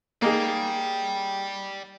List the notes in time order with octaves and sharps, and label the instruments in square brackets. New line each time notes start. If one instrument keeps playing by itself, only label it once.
[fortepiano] A#3 D#4 G#4 [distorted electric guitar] D5 G5